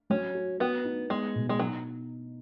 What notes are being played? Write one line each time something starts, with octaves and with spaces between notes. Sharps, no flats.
F#3 C#4
F#4
B3 F#4
D#4
G#3 B3
B2
G#3
F#3 D#4